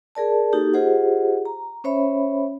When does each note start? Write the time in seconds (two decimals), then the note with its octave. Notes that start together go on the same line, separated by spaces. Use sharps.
0.15 G#4 A#4 D5 A5
0.53 A#3 D#4 F#4 G4 A4
0.74 F4 G4 G#4 C5 D#5 F#5
1.45 A#5
1.84 C#4 C5 C#5 E5 B5